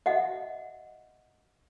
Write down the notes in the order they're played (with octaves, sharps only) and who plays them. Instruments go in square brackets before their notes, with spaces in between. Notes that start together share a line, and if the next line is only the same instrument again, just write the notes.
[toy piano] D#5 E5 F#5